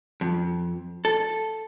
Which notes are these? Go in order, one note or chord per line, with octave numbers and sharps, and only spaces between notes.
F2
A4